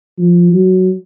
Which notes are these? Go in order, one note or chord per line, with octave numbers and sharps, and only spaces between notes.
F3
F#3